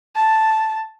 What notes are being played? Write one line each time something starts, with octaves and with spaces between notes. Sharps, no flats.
A5